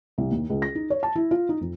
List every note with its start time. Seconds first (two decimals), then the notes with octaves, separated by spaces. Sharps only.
0.18 C2
0.31 D#2
0.50 C#2
0.62 A#6
0.75 D#4
0.90 C#5
1.03 A5
1.16 E4
1.31 F4
1.49 D#4
1.61 F2